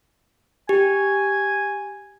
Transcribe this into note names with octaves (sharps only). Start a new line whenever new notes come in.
G4 G#5